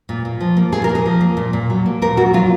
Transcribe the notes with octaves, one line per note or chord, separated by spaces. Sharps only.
A#2
A#2
F3
A#3
A#2 G#4
A#4
A#2
G#4
F3
A#3
A#2
A#2
F#3
A#3
A#2 A#4
A#2 F#4
F#3 F4